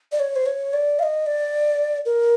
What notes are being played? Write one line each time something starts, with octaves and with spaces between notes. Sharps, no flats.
D5
C#5
C5
C#5
D5
F5
D#5
D5
A#4